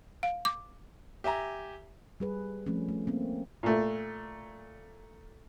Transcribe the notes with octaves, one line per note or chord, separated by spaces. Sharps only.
F5
D6
G4 E5 G#5 A#5
G3 G#4 B4
F3 A3 C4 C#4
A3
A#3 C4 C#4
A#2 A3